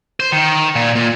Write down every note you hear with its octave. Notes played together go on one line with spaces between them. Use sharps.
C5
D#3
A#2
A#2